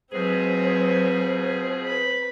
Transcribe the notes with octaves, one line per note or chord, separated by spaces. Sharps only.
F2 B2 F#3 G#3 C4 G#4 B4 C5
B4 B5